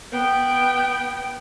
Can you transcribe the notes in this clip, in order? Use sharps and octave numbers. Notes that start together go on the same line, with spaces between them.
B3 G5